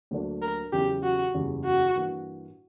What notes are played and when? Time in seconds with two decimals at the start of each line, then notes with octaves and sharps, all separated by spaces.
0.11 D2 D3 F#3 A#3 D4
0.42 A#4
0.72 E2 C#3 F#3 C#4 E4 G4
1.03 F#4
1.34 F#1 E2 C#3 G3
1.65 F#4
1.96 G2 E3 A#3